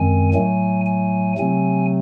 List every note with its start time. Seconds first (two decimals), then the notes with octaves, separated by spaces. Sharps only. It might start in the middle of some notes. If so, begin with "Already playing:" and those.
Already playing: F#2 D#3 G#3 C4 G#5
0.33 A2 F#3 A3 G#5
0.86 G#5
1.38 C3 F#3 A3 C4 G#5